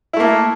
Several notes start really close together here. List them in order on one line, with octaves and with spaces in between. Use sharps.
E4 A3 A#3 A4